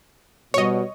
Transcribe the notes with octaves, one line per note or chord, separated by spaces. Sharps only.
B2 G3 F#4 C5 C#5 D#5